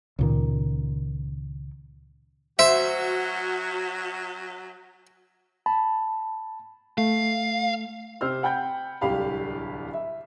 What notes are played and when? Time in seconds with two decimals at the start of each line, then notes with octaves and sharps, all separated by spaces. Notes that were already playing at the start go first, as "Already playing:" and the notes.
0.19 C#2 A#2 D#3
2.59 F#3 F#4 C5 E5
5.66 A5 B5
6.98 A3 F5
8.21 C3 G4 C5 E6 F6
8.43 F#5 G5 B5 G6
9.01 D1 C2 D3 G4 F5 B5
9.94 E5